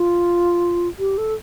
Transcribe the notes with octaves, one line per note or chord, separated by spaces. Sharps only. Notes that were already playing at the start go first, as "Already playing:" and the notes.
Already playing: F4
G4
A4